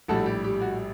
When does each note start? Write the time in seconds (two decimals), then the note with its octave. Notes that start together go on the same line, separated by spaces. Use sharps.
0.08 A#1 A2 G3 F#4 A4
0.26 G4
0.44 G4
0.62 F#4